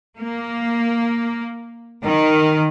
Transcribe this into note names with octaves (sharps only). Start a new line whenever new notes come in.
A#3
D#3